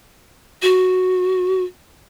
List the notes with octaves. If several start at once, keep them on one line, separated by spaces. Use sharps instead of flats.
F#4